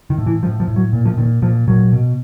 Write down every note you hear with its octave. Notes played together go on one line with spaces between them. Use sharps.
D#3
A2
E3
A2 F3
F3
A2
F#3
A#2
F3
A#2 D#3
A#2 F3
A#2 F#3
B2